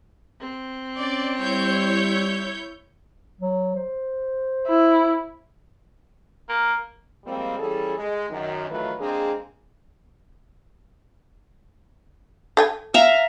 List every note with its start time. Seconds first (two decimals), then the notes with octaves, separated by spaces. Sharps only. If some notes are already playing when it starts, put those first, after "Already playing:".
0.41 C4
0.99 C#4 D5
1.40 G3 E4 C#5 G6
3.41 F#3
3.75 C5
4.67 E4
6.49 A#3
7.25 F3 G3 G#3 A#3 C4
7.58 E3 G3 C#4 G#4 A4
7.98 G#3
8.30 F#2 D#3
8.69 D#3 E3 F#3 A3 F4 B4
9.00 G#3 A#3 C4 D4 G#4
12.57 A4 G5 G#5
12.94 E5 F5 A#5